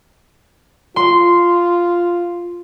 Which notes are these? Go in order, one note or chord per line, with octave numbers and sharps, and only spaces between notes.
F4 C6